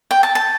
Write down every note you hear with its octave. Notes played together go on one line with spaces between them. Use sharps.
G5
A5
A5